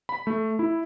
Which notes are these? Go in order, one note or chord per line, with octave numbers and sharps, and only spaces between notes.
B5
A3
E4